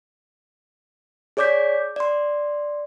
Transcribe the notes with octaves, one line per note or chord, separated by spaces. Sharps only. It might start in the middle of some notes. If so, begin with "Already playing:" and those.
G#4 C#5 D5 D6 G6 B6
D5 C6